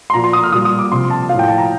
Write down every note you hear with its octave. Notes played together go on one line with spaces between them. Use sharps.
C6
A#2 F3 A#5
C6
D#6
F6
A#2 G3 D#6
D#6
D6
C3 F3 C6
A5
A2 F3 F5
G5
A5
A#5